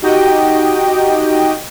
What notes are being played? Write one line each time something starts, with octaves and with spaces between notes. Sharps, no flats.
D#4 F#4 G4 D#5 G5